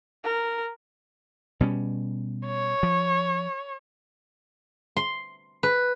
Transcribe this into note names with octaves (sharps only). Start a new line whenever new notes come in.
A#4
B2 G3 C#4
C#5
F3
C6
B4